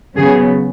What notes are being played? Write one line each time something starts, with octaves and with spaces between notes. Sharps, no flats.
C#3 F#3 B3 G#4